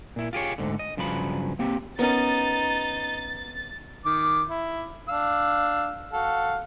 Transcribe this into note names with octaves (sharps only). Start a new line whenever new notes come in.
A#2 E4
F4 G4 G#4 C#5
D2 G#2 D3
D#5
G2 C#3 F3 F#3 B5
A#3 C4 G4
B3 C#4 D#4 A#4 A6
D#3 D6
E4
D4 F5 E6
F#4 A4 F5